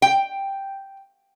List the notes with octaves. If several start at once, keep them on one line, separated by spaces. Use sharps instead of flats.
G5